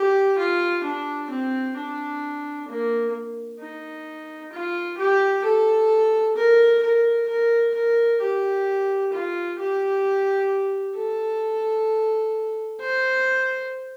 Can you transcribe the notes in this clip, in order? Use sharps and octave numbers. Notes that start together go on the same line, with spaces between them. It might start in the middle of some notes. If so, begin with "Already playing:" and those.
Already playing: G4
F4
D4
C4
D4
A#3
D#4
F4
G4
A4
A#4
A#4
A#4
A#4
G4
F4
G4
A4
C5